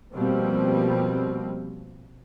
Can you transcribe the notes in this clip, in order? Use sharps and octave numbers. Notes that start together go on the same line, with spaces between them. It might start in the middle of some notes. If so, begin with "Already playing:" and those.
B2 F3 G3 A#3 C4